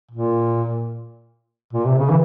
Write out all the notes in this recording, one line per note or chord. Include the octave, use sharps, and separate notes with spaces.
A#2
A#2
C3
C#3
E3